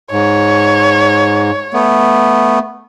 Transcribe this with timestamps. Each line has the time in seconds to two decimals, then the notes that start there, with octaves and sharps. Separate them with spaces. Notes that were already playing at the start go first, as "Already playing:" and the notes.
0.12 G#2 C#5
1.73 A3 B3